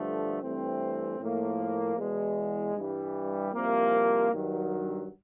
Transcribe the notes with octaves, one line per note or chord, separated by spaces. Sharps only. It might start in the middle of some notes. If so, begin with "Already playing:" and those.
Already playing: G2 D3 F3 A3
G2 E3 A3 C4
A2 F3 A#3
E2 B2 G#3
G2 E3 G3
C2 C3 F3 A#3
G2 D#3 F#3